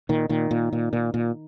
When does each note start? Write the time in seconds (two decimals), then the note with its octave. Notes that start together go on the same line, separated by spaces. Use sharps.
0.09 A#2 D#3
0.29 A#2 D#3
0.51 A#2
0.73 A#2
0.93 A#2
1.14 A#2